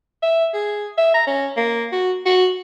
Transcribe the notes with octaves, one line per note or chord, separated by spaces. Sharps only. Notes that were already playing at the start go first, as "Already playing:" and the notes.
E5
G#4
E5
A#5
C#4
A#3
F#4
F#4